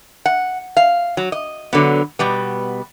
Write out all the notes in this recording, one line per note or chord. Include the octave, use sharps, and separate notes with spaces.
F#5
F5
F#3
D#5
D3 F#3 B3
B2 G3 B3